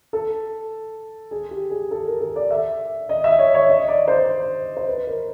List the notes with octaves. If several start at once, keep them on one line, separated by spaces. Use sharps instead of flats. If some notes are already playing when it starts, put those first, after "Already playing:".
A4
G#4
G4
G#4
A4
A#4
A4
D5
E5
D#5
E5
C#5
C#5
D#5
D5
C5
C5
B4
A#4